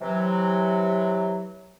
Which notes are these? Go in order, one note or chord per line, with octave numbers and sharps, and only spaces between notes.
C3 E3 F#3